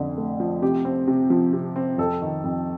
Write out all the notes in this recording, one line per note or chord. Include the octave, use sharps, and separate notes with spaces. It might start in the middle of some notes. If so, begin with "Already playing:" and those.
Already playing: F2 D3
A3
F3
C3 G4
C4
C3
F3
C3
C4
F2 A4
D#3
F2